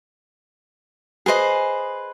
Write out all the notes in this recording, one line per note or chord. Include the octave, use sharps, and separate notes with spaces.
G#4 B4 C5 D#5